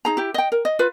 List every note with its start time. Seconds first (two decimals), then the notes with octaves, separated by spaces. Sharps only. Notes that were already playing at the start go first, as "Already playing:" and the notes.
0.05 D#4 G#4 A#5
0.17 E4 G4
0.34 D#5 G5
0.52 A#4
0.65 D#5
0.79 F4 B4